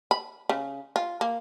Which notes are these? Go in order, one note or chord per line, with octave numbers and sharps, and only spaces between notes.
B5
C#3
F4
A#3